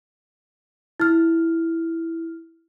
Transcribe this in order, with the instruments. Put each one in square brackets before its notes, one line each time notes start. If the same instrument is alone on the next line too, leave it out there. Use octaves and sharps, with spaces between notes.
[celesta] E4 F6